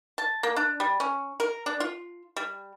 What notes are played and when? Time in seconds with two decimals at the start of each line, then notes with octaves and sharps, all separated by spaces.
0.18 A5
0.43 A#3
0.56 D4
0.80 G3
1.00 C#4
1.40 A#4
1.66 D4
1.80 F4
2.36 G3